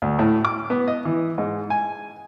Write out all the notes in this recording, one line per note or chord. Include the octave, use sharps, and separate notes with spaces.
D2
A2
D6
B3
D#5
E3
G#2
G#5